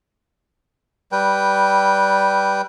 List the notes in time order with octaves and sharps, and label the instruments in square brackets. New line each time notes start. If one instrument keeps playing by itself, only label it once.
[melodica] G3 B4 G5